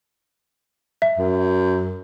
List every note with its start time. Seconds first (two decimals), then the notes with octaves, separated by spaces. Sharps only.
1.02 E5
1.17 F#2